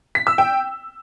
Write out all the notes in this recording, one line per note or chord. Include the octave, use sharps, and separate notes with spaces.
B6
E6
G5